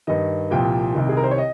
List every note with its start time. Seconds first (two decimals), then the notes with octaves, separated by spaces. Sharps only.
0.07 G2 D#3 D#5
0.51 C2 A#2 F3 G5
0.95 C2 C3 D#3
1.09 G#4
1.17 A#4
1.23 C5
1.31 C#5
1.38 D#5